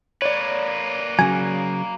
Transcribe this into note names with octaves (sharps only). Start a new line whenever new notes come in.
A#3 B4 C#5 D5
C#3 F#3 G#5